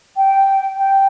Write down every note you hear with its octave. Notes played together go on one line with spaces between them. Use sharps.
G5
G5